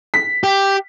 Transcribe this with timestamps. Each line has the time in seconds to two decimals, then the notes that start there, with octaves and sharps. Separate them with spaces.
0.14 B6
0.44 G4